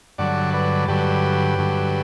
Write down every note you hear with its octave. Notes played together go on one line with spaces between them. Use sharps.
G2 D3 F#3 D5 F#5
B4 D5
G2 D3 F#3 G4 B4
G2 D3 F#3